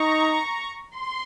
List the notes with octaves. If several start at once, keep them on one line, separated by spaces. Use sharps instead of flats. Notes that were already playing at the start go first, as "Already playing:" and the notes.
Already playing: D#4 A#5 C#6
C6